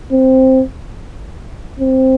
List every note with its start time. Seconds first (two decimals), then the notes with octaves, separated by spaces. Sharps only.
0.12 C4
1.79 C4